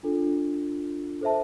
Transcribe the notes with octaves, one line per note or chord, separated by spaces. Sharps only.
D4 F4 A4
A4 C5 E5 A5